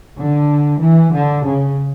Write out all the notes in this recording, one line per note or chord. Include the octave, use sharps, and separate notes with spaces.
D3
E3
D3
C#3